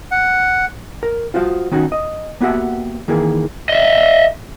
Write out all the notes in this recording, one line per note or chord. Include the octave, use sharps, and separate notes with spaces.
F#5
A#4
F4 F#4 C5 F5
D#3 C#4 D#4 F#4
D#5
A#3 B3 F#4 G4 E5 F#5
D#3 E3 A#3 G#4
D#5 E5